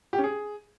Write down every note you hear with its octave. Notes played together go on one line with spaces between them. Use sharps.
G4
C#4
G#4